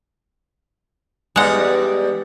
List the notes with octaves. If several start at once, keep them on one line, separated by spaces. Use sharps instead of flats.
E2 G3 G#3 D#4 F#5